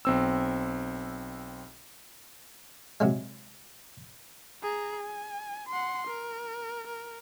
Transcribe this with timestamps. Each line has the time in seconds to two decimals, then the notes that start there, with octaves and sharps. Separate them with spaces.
0.05 B1 C4 E6
3.00 C3 F#3 G#3
4.63 G#4 A#5
5.04 G#5
5.69 F#5 C6
6.07 A#4
6.87 A#4